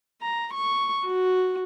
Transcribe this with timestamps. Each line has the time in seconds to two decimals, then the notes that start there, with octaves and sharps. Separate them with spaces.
0.22 A#5
0.54 C#6
1.06 F#4